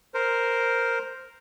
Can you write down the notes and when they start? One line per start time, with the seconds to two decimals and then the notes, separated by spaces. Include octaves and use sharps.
0.14 A#4 C5